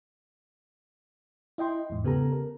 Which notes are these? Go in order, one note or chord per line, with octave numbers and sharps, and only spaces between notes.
E4 D#5 G5 C6
E2 G#2
C#3 B3 G4 A4 A#5
A#4